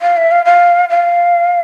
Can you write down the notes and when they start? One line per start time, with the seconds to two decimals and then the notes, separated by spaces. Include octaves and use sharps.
0.01 F5
0.17 E5
0.31 F5
0.45 F5
0.90 F5